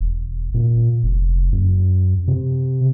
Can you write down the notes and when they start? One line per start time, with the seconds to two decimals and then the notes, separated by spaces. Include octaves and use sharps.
0.01 E1
0.54 A#2
1.03 F1
1.52 F#2
2.28 C3